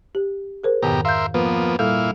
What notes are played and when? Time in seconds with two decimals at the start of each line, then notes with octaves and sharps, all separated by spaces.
0.15 G4
0.64 G#4 A#4 C5
0.83 F2 G#2 B2 D#3 G4 A#5
1.05 A#4 E5 F5 C6 G6
1.34 F3 A#3 B3 B4
1.79 A#2 G3 E4 A4 F5 F6